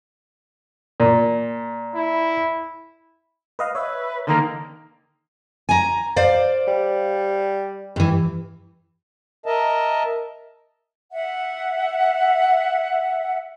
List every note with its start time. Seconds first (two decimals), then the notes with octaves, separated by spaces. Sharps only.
1.00 A#2
1.96 E4
3.59 B4 D#5 F5
3.75 B4 C#5 E5
4.27 D3 D#3 A#3 A#4
5.69 G#5 A#5
6.16 C5 D5 F5
6.68 G3
7.96 G2 E3
9.46 A#4 D#5 E5 A5
11.12 E5 F#5